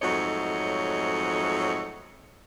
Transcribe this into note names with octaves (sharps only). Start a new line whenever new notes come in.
F2 G#2 F#3 A3 C#5 D#5